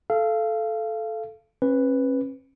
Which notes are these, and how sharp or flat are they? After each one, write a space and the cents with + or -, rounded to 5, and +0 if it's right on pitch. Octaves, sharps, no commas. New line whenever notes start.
A4 -10 F5 -25
C#4 -40 B4 +0